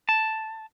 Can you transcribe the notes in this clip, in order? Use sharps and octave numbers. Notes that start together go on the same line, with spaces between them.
A5